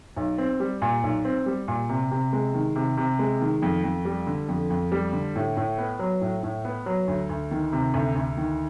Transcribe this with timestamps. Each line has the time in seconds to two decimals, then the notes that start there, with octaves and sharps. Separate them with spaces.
0.16 B1
0.38 C4
0.60 G3
0.82 A#2
1.03 B1
1.25 C4
1.46 G3
1.68 A#2
1.89 C3
2.11 C3
2.33 G#3
2.54 D#3
2.76 C3
2.97 C3
3.19 G#3
3.41 D#3
3.62 F2
3.84 F2
4.05 G3
4.27 D3
4.49 F2
4.70 F2
4.92 G3
5.13 D3
5.36 A2
5.57 A2
5.78 B3
5.99 F#3
6.21 A2
6.43 A2
6.65 B3
6.86 F#3
7.08 D2
7.29 D2
7.51 D#3
7.72 C3
7.94 D2
8.16 D2
8.37 D#3